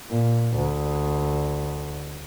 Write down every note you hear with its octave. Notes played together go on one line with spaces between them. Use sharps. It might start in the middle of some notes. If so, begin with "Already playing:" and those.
A#2
D2